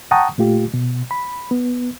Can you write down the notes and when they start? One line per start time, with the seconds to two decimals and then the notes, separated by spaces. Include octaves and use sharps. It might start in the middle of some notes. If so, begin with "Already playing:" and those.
0.11 F#5 G5 A5 A#5 C#6 D#6
0.38 A#2 A3 F4 G4
0.74 B2
1.11 B5
1.51 B3